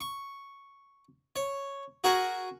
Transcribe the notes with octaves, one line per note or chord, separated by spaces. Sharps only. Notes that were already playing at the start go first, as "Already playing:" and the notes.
C#6
C#5
F#4 G#4 A#4 F#5 G#5